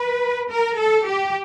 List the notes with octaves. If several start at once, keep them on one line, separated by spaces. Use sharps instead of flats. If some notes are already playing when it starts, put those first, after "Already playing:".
Already playing: B4
A#4
A4
G4